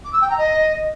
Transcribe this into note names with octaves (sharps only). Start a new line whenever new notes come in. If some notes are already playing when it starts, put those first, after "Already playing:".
D6
E6
G5
A#5
D#5